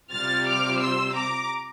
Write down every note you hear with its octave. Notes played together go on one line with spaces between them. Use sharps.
C3 G3 C4 F4 F6 A6
D6 F6
C6 E6
A#5 D6